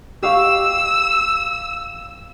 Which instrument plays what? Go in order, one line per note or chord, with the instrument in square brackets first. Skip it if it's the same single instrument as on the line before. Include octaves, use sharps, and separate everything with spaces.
[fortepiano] G4 F5 C#6 [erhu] E6